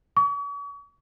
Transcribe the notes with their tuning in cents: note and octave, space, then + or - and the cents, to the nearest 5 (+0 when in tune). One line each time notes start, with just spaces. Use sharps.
C#6 +45